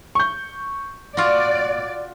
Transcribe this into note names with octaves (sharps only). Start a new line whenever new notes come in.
C#6 G6
F4 F#4 D5